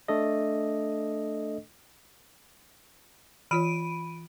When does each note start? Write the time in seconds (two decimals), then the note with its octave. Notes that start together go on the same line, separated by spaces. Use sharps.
0.08 A3 D4 A4 D#5
3.51 E3 F4 C#5 B5 D7 D#7